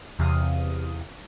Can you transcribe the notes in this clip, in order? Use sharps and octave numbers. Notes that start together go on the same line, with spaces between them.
E2 C3 F5 D#6